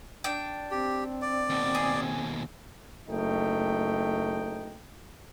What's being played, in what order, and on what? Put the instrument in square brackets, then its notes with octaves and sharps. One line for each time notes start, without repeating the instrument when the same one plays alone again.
[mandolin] D4 G5
[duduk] C4 [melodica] G4
[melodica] D5
[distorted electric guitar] D#2 B2
[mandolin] G#4
[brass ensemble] F#1 A3 D#4 G5